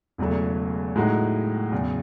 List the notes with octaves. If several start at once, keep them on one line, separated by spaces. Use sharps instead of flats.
E1 E2 C#3 F#3 A3
A2 G#3 D#4 F#4
E2 C#3 F#3